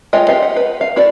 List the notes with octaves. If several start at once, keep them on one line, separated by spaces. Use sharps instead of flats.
G#3 F4 C#5 D#5 G5
F4 G4 D#5 F5
F#5
B4
F5
E4 F#4 A4 D5